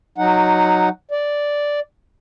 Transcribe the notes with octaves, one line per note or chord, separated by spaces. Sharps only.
F#3 D#4 F#5
D5